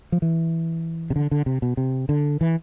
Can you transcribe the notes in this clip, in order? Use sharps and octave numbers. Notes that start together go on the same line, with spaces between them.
F3
E3
C3
D3
D3
C3
B2
C3
D3
E3